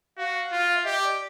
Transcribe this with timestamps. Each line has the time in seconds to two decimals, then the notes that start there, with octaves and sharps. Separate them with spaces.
0.17 F#4 F5
0.52 F4
0.75 E5
0.85 G4 D#5
1.03 D5